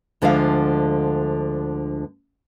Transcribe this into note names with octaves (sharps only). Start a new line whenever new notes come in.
D2 D3 F3 G#3 E5 F5